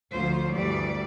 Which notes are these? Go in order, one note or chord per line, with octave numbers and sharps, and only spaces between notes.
D2 F3 F4 C5
D2 G2 E3 G3 D5